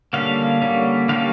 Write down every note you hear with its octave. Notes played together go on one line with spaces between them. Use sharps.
D3 G3 A#3 C#4 F5
D3 G3 A#3 C#4
D3 G3 A#3 C#4 F5